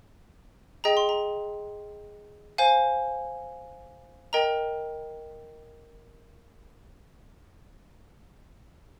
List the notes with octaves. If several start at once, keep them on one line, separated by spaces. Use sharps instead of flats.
G#4 D#5 G5 A#5
C6
A#5
C5 F5 G#5
A#4 D#5 G5 A#5